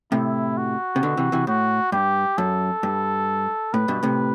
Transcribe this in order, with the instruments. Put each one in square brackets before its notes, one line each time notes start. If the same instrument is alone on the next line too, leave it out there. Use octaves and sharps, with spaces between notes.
[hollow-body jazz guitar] A2 C3 [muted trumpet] E4
[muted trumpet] F#4
[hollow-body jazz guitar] C3
B2 D3
C3 E3
C3 E3
[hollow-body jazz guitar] A2 [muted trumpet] F#4
[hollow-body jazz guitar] G2 [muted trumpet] G4
[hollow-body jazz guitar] F#2 [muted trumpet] A4
[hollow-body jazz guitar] G2
[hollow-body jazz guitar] A2 [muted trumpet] B4
[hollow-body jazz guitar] G2 B2
A2 C3